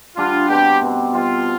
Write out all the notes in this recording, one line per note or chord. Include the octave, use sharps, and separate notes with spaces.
D3 G3 D4 F4
B2 G3 C4 G4
B2 G3 C4
B2 G3 C4 F4